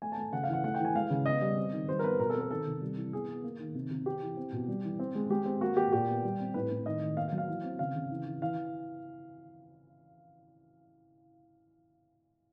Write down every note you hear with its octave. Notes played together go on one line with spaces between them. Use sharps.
A3 G#5
A5
A3
C#3 F#5
F5
E3 F#5
A3 F#5
G5
E3
G#5
G#3 F5
C#3
B3 D#5
G3
C4
D#3
G3 C5
A#4
B3 B4
B2 A#4
A4
C4
A#4
D#3 A4
C3
G3
E3
B3 G#4
B3
A#3
D#3
C3
C3
C4 G4
E3
C4
B2
G3
E3
C4
G#3
G#3 G4
C4
A#3 F#4
A#3 G4
A#2 G4
B3
G3
C4
A2 B4
A2
D#3 D#5
D#3
A#3 F5
F5
F#3
F5
E3
C4
C#3 F5
C#3
E3
E3
E3 F5